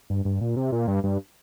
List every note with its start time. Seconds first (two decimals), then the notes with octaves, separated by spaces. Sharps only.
0.10 G2
0.25 G2
0.41 A#2
0.56 C3
0.72 A#2
0.88 G2
1.04 G2